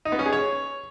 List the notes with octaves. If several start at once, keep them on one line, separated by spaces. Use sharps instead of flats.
D#4
B3
C#4
G#4
C#5